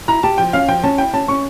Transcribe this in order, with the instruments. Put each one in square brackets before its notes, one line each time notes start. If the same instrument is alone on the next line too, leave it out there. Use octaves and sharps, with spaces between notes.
[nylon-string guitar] E4 [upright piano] A#5
[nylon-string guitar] G4 [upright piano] A5
[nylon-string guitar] F3 [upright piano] G5
[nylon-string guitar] C#4 [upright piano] F5
[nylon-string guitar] F3 [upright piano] G5
[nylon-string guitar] C#4 [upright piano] A5
[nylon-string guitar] E4 [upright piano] G5
[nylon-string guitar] C#4 [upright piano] A5
[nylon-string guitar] C#4 [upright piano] C#6